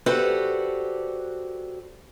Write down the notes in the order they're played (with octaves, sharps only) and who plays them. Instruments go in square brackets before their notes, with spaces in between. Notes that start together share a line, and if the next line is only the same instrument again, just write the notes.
[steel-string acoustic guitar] F#4 G4 A4 B4 C5 D5